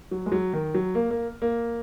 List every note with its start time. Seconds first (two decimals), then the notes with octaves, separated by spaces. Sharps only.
0.11 F#3
0.26 G#3
0.32 F#3
0.53 D#3
0.74 F#3
0.95 A#3
1.11 A#3
1.42 A#3